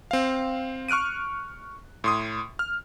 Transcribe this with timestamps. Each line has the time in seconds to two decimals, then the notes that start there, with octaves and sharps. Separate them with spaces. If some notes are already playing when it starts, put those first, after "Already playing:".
0.11 C4 F5
0.88 C#6 F6 F#6 D7 D#7
2.04 A2 C6 D#6
2.59 F6